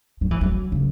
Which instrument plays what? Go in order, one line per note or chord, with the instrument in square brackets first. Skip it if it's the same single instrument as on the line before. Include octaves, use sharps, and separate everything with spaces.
[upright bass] F#3
E3
F#3
C#3